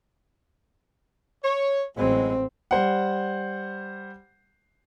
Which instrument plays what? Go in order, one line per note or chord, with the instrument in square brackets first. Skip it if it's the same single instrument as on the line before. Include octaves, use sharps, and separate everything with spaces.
[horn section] C#5
[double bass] A1 C4 [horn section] F#3 G#3 E4
[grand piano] G3 C5 F#5